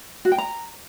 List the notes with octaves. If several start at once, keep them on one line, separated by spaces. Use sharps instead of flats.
F#4
G5
A#5